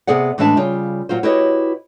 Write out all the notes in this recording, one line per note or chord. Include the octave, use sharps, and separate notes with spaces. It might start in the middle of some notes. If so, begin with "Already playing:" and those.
C3 B3 G#4 D5 F#5
A2 E3 G#3 D4 E5 A5
C#3 G3 F4
A#2 F#3 F4 C5
E4 F#4 G4 B4 C#5 D#5